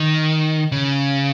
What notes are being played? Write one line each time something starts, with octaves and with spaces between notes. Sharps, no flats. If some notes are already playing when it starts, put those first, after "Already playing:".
Already playing: D#3
C#3